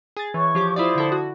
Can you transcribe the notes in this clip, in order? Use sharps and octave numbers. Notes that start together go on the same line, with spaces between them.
G#4 A6
E3 C#5 C#6
F3 G4 D6
E4 F4 C5 D5 D#6
D3 E4 A4
F#4